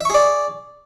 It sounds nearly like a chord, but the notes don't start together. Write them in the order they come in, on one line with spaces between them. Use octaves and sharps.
E5 C#6 G#4 D5